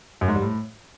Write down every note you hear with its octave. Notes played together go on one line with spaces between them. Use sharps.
F#2
G#2
G3
A2